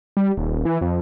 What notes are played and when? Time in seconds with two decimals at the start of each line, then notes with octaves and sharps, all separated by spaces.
0.17 G3
0.37 D#1
0.65 E3
0.81 F2